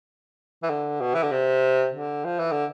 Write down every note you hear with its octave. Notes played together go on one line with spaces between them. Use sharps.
E3
D3
B2
E3
D3
C3
D3
F3
E3
D3